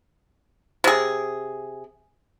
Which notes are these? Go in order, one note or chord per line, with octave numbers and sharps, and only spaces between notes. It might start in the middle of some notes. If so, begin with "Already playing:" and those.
C3 G#4